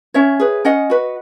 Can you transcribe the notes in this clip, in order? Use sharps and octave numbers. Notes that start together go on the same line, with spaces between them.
C#4 C#5 E5
G#4 B4
C#4 D#5 F#5
F#4 B4